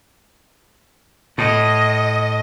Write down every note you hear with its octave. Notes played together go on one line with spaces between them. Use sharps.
A2 D#5